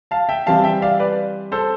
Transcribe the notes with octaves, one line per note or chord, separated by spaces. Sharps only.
F5 A5
E5 G5
E3 G3 C4 F5 A5
E5 G5
D5 F5
B4 D5
A4 C5